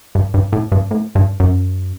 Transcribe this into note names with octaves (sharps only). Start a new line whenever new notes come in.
G2
G2
A2
G2
A2
G2
F#2